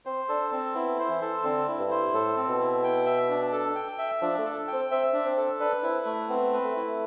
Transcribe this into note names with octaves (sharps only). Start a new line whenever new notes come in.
C4 C5
D4 A4
C4
B3 E4
C5
E3
A4
D3 C4
E4
G2
C5
A2 A4
C4
B2
E4
G5
E5
D4
A4
G5
E5
F3 D4
A3
A4
G5
C4
C4 E5
D4
C4
A4
D4 B4
C4 E4
A3
B3 C4
B4
A3
E4